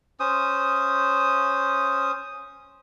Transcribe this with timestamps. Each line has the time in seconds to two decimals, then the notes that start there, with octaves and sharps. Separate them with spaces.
0.20 C#4 C5 D#6